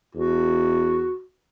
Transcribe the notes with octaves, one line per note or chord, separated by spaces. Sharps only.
E2 F#4